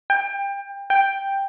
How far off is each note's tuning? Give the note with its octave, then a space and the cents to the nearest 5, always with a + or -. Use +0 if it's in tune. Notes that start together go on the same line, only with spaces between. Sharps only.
G5 +25
G5 +5